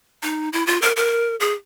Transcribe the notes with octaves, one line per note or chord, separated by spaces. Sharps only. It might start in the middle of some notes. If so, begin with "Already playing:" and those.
D#4
E4
F4
A#4
A#4
G#4